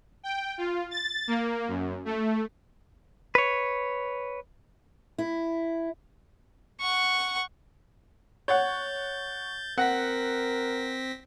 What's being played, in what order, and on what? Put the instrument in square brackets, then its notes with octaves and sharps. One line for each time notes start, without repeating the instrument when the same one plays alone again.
[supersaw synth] G5
F4
A6
A#3
F#2
A3
[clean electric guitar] B4 C#5
[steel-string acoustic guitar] E4
[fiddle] F#5 C#6
[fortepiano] C#5 F#5 [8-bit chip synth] G6 A6
[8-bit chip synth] C4 A#6 B6 [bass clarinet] A#4 [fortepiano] F#5